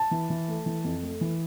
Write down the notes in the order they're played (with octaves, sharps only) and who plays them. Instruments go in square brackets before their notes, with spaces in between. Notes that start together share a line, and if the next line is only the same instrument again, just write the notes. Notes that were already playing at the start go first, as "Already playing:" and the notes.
Already playing: [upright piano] A5
[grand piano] E3
E3
A3
E3
F2
A3
E3